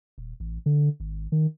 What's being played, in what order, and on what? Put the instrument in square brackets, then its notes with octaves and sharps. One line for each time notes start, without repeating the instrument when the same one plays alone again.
[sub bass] D#1
A1
D3
G#1
D#3